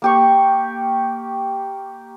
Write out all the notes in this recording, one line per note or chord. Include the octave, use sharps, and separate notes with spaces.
A#3 G4 C#6